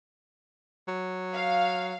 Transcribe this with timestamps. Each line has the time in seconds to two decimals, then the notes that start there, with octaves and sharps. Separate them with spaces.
0.88 F#3
1.33 F5